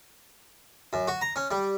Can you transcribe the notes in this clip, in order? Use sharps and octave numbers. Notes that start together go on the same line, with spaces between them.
F#2
F#4
A#5
C#4
G3